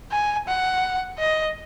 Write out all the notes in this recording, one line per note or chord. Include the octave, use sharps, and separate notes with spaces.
G#5
F#5
D#5